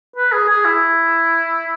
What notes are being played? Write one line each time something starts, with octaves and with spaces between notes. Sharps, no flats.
B4
G#4
G#4
E4